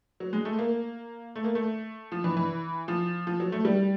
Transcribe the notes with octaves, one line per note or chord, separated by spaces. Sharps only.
F#3
G#3
A3
A#3
A3
A#3
A3
F3
E3
E3
F3
F3
F#3
A3
G3